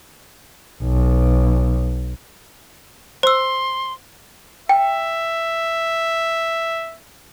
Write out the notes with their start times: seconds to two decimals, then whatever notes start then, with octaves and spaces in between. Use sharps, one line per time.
0.82 B1
3.23 C5 C6 E6
4.69 E5 G5